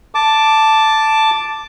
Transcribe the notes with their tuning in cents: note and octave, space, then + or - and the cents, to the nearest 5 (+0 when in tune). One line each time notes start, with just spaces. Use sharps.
A5 +0 D6 +0